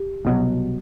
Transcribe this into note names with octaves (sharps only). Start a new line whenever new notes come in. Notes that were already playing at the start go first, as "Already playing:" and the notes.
Already playing: G4
C2 B2 F#3